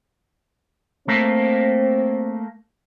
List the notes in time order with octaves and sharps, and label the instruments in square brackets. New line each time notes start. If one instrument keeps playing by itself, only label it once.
[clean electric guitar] A3 A#3 [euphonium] C4